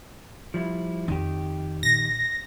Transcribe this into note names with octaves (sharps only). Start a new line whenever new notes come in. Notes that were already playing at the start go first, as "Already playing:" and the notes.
F3 G3 E4
F2 D#3 F4 G4
A#2 A#6